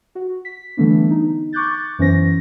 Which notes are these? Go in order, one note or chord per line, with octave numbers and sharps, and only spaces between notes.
F#4
B6
D3 E3 G3 A3 B3 D4
D#4
C#6 D6 F#6 G6 A6
F#2 E3 B3 C#4 C5 A#6